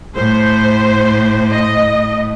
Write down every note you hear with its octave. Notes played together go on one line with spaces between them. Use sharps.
A2 C5
D#5